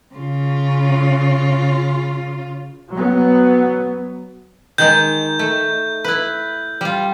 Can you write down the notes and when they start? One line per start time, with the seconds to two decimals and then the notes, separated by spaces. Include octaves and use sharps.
0.15 C#3 F4
2.92 F#3 B3
4.78 D#3 G#3 D#4 G6
5.39 A3
6.04 E4 B4
6.81 G3 F4